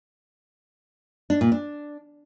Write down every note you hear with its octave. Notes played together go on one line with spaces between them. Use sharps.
D4
A#2
D4